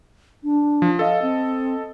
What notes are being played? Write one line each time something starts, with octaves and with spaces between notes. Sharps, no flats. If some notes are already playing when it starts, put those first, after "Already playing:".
D4
F3
A4 D#5 F5
C4